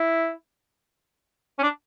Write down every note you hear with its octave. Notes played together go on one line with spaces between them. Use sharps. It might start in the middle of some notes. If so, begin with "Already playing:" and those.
Already playing: E4
C#4
D4